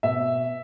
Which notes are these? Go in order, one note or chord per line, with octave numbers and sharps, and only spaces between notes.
B2 E5